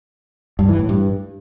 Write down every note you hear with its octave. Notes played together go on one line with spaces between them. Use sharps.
G2
E3
A2
G2